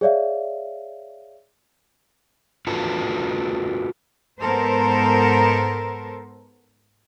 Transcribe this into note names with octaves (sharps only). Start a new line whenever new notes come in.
G#4 C#5 D5 E5 F5
F4 F#4 A4 B4
G#2 B3 A4 A#4 C5